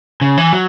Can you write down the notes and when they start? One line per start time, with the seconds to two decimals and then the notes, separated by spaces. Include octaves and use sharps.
0.21 C#3
0.37 E3
0.53 F#3